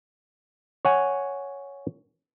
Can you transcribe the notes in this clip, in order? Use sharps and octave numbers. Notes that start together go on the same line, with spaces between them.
C#5 F#5 G#5